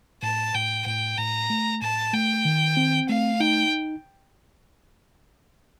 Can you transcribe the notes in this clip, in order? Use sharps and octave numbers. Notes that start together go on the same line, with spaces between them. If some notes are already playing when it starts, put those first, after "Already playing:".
A2 A5
A2 G5
A2 G5
A2 A#5
A3
A2 A5
A3 G5
D#3
C4
A3 F5
D#4 G5